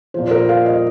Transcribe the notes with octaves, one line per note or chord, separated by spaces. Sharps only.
A#2 F3 C5
C5
A#4
F5
D#5